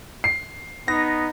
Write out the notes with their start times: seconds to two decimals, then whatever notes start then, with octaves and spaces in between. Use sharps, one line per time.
0.24 C7
0.88 B3 D#4 A#6